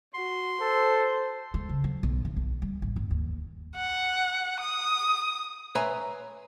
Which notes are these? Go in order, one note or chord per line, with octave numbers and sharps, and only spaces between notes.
F#4 C6
A4 C5
G#3
C#3
F#3
B1
D#2
B1
G3
A1
G1
D#2
F#5
D#6
B4 C#5 E5 G#5 A#5 C6